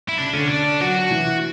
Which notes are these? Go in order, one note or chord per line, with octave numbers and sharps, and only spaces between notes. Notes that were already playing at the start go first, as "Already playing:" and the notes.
E4
C#3 D4
D3 C#4
D4
F#3 F#4
E3